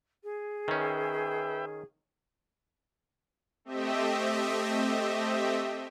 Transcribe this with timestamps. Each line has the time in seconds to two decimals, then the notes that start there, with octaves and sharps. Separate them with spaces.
0.23 G#4
0.68 D#3 C#4 B4 E5 G5
3.65 A3 C4 G4 D#5 E5